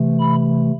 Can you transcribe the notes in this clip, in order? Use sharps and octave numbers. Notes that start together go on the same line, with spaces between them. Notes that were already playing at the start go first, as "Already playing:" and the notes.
Already playing: C3 E3 A3
B5